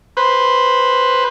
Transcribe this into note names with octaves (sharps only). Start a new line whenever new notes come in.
B4 C5